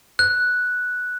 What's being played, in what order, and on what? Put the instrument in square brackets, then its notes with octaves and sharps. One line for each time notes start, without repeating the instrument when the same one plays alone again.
[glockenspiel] F#6